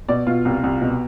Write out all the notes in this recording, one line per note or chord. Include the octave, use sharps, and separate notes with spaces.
B2 D5
B2 F4
C2
C2
B2